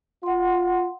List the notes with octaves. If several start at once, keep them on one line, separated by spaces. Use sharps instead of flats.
F4 F#5 C6